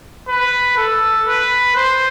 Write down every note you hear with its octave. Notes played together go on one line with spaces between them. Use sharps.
B4
A4
B4
C5